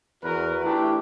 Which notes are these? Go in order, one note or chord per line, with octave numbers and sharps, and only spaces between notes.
E2 F#4 A#4 B4
A3 D4 E4 G4